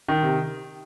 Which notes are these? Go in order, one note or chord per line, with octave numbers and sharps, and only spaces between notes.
D#3
C3